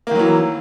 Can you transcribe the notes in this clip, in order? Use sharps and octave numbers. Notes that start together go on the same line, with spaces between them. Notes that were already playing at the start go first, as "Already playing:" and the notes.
D#3 E3 F#3 A#3